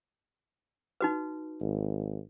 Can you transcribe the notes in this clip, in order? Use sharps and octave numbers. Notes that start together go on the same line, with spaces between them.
D#4 F#4 B4
G#1